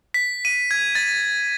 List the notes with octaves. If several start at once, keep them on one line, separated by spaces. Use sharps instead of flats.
B6
D#7
G#6
A6